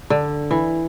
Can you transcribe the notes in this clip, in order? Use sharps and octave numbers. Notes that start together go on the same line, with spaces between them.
D3
E3